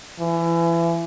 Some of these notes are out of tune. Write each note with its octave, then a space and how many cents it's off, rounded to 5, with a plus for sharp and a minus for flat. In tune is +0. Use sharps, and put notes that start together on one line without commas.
E3 +30